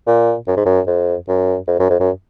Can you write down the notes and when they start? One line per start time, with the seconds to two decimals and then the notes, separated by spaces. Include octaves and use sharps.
0.07 A#2
0.47 F#2
0.57 G#2
0.66 F#2
0.87 F2
1.28 F#2
1.68 F2
1.79 F#2
1.90 F2
2.00 F#2